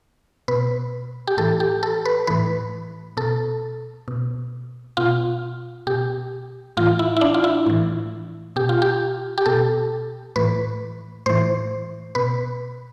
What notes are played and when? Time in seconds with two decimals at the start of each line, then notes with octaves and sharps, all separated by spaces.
0.48 B2 B4
1.27 G4
1.37 A2 E3 A4
1.60 G4
1.83 A4
2.05 B4
2.27 A2 E3 B4
3.17 B2 A4
4.08 B2
4.97 B2 F4
5.87 B2 G4
6.77 A2 E3 F4
6.99 E4
7.17 E4
7.21 D4
7.34 F4
7.44 E4
7.66 A2 E3
8.56 B2 G4
8.69 F4
8.82 G4
9.38 G4
9.46 B2 A4
10.36 A2 E3 B4
11.26 A2 E3 C5
12.15 B2 B4